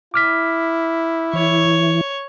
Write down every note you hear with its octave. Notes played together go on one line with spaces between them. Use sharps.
E4 D6 F6 B6
E3 C#5